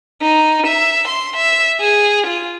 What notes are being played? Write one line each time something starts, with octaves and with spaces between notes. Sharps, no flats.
D#4
E5
C6
E5
G#4
F4